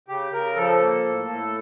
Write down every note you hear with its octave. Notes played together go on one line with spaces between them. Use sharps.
C#3 G4
C#3 A#4
F3 A4
A#3
A2
A2